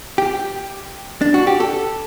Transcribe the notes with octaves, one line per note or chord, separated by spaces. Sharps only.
G4
D4
F#4
G4
A4